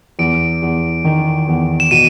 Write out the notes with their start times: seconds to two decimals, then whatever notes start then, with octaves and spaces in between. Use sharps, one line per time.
0.19 E2 D7
0.62 E2
1.05 D#3
1.48 E2
1.80 E7
1.91 B2 D#7